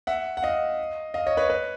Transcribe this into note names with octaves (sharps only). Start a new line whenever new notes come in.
E5 F#5
F#5
D#5 F5
D#5 F5
C#5 D#5
B4 C#5
B4 C#5